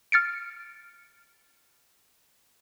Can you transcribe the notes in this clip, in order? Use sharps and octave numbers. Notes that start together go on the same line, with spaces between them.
F6 A6 C#7 D7